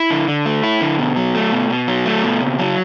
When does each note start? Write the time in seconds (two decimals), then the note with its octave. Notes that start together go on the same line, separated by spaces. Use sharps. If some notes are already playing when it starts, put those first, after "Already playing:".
Already playing: E4
0.10 D3
0.28 D3
0.46 A3
0.63 E4
0.81 D3
0.99 B2
1.17 F#3
1.34 A3
1.52 B2
1.70 B2
1.88 F#3
2.05 A3
2.23 B2
2.41 C#3
2.58 F#3